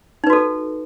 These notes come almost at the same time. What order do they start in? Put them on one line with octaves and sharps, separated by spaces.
D#4 B4 F#4 A4